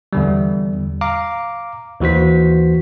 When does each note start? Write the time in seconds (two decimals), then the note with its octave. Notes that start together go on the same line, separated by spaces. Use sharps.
0.13 E2 D3 G3
1.01 F5 A#5 D6
2.00 D#2 E3 F#4 C5 B6